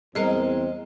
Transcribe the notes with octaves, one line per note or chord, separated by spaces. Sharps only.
E2 G3 G#3 C4 A#4 D#5